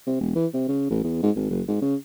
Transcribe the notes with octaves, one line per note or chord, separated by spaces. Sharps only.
C3
E1
E3
C3
C#3
A1
E2
G#2
G#1
F#1
G#2
C#3